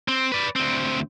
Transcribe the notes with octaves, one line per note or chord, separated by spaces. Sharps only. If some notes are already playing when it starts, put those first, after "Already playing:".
C4
B4 D5
D2 C4